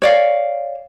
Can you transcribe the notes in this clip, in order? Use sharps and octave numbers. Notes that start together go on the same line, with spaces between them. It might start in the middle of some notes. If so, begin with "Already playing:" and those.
C#5 D5 F5